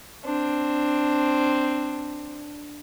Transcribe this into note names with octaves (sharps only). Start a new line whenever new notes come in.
C4 D4